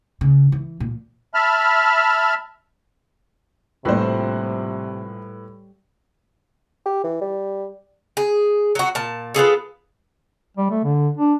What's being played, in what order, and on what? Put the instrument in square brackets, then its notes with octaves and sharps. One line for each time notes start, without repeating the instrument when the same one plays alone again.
[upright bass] C#3
E3
A#2
[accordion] E5 A5 B5 F6
[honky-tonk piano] A#1 C5 [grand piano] A2 B4 [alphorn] C3 [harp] G3
[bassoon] G4
E3
G3
[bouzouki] G#4
F#3 F#4
A#2 A5
B3 F4 G#4 A4
[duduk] G3
A3
D3
D4